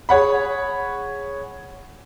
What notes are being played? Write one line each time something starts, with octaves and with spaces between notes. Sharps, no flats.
G#4 C#5 F#5 B5